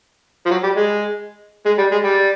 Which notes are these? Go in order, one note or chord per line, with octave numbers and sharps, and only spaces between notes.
F3
F#3
G3
G#3
G#3
G3
G#3
G3